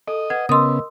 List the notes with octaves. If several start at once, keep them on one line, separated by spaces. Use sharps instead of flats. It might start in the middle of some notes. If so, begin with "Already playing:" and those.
A4 D#5
B4 F#5 G#6
C#3 B3 A#4 D#5 C6 D#6 E6